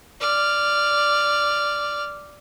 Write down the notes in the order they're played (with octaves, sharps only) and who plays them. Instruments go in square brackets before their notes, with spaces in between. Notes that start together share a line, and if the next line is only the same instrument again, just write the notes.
[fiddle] D5 F6